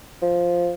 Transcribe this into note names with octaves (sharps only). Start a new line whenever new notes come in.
F3